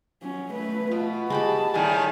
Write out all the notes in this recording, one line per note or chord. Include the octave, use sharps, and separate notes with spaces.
F#3 C#4
A3 B4
B2 F4
G#3 G4 A5 B5 D6
A2 D#3 G3 G#5